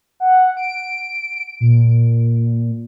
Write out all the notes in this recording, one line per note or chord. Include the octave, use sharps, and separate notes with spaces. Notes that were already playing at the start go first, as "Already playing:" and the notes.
F#5
D7
A#2